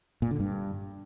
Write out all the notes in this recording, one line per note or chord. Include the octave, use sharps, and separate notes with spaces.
A#2
D3
G2